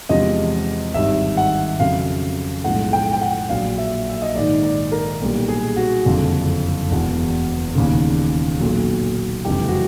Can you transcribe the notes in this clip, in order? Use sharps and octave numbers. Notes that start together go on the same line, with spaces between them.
E2 C3 F3 G#3 D#5
G#1 G2 D#3 E5
F#5
F2 C#3 F#3 F5
B1 A2 F3 G#3 F#5
G5
G5
F#5
A#1 A#2 F#3 F5
E5
E5
D#5
A#1 G#2 D#3 D5
D5
A#4
B1 A#2 G3
G#4
F#4
F#1 F2 D3
E1 E2 B2
E1 D#2 C#3
B1 A#2 F#3
F#1 F2 C3 E3 G#3 G4
F#4